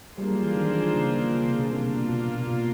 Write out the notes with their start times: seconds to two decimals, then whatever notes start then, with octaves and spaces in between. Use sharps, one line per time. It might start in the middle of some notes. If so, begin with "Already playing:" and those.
0.18 G3 A#3 D4 F4 G#4 C5
0.31 F#3
0.43 E3
0.56 D#3
0.75 D#3
0.95 C#3
1.33 C#3
1.45 C3
1.59 B2
1.71 C3 A#3 D4 F4
2.09 B2
2.28 A#2
2.47 B2